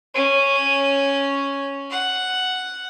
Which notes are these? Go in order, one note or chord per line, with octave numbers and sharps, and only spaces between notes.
C#4
F#5